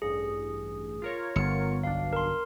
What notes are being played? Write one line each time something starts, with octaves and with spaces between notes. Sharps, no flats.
A1 G2 G#4
F4 A#4 C#5
G1 B3 C#7
B1 D4 F5
A#4 C6